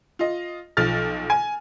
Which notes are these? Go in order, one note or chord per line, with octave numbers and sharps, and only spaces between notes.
F4 D#5
B1 F3 F6 A6
G#5